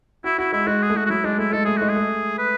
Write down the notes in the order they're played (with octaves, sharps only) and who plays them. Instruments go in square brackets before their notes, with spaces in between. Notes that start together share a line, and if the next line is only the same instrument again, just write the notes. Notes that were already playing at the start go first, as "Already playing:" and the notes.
[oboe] E4 [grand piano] F#4
[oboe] E4 [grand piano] F#4
[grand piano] G#3 [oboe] E4
[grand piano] G#3 [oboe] F#4
[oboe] G#4
[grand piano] A3
[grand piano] G#3 [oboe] F#4
[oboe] F#4
[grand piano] F#3 [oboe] E4
[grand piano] G#3 [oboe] D4
[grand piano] A3 [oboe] E4
[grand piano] G#3 [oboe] A4
[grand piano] A3 [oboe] G#4
[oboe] F#4
[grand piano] G#3
[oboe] G#4
[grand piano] A3
[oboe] B4